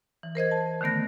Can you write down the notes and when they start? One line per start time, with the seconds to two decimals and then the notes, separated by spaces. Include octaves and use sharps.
0.23 E3
0.35 A#4 C5 D#5 G#6
0.51 A5
0.81 D3 D#3 A3 B3 A#6